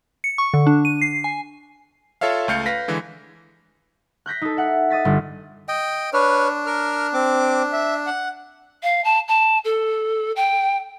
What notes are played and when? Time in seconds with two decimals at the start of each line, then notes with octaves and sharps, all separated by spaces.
0.24 C#7
0.38 C#6
0.54 D3
0.67 D4
0.85 D#7
1.01 C7
1.24 G#5
2.21 F4 A4 C#5 E5 F5
2.48 C#2 A3 F5 G6 C#7
2.66 B4 F5 A#6 B6
2.88 D3 E3 G#3
4.26 F#6 G6 A#6 B6
4.42 D#4 A4
4.57 E5 F#5
4.90 D#5 D#6 A6 B6
5.05 G1
5.68 D#5 G5
6.13 D4 B4 C#5 F6
6.66 A#4 F6
7.14 C4 D6
7.73 E5
8.07 F#5
8.83 F5
9.04 A5
9.28 A5
9.64 A4
10.36 G5